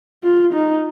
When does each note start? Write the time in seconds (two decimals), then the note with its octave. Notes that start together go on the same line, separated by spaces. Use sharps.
0.24 F4
0.53 D#4